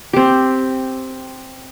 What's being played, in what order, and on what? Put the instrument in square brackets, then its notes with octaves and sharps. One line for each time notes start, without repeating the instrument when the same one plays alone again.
[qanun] C4 G4